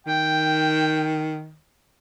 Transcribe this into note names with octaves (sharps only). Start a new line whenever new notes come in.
D#3 G5